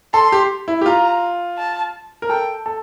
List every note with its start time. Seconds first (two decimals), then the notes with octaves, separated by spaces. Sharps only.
0.14 A4 C6
0.32 G4
0.68 E4
0.81 G4
0.86 F4 A#5
1.58 A5
2.22 A#4
2.30 A4 G5
2.66 A4